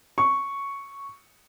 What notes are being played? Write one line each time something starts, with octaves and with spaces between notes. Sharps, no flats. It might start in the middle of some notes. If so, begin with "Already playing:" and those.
C#6